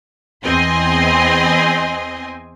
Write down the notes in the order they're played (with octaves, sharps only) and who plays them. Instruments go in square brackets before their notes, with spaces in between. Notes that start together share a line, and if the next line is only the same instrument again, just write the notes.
[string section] E2 C4 D#5 G#5 C6